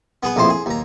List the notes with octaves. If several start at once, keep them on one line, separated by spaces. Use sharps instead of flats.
B3 G#4 B4
A#1 F2 A2 C5 A5 C6
G#4
D#2 A#5